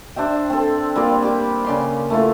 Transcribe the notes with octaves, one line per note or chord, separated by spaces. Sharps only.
D4 C5 E5 G5
C4 A4
G3 A#3 F4 D5
G4 D6
C#3 D5 C6
A3 E4 F4